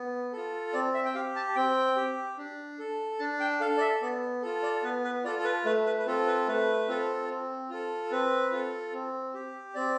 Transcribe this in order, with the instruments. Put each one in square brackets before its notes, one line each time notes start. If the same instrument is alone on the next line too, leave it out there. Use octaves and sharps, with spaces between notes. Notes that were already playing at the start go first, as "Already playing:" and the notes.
Already playing: [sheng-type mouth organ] B3
F4 A4
C4 D5
E5
G5
G4 F5
A5
C4 G5
G4
D4
A4
D4 A5
G5
A4 F5
D5
E5
B3 D5
F4 A4
D5
B3 B4
B4
F4 D5
A4
A4
B4
A3 B4
B4
B4
C4 F4 A4
B4
A3 B4
C4 F4 A4
C4
F4 A4
C4 B4
F4 A4
C4
G4
C4 D5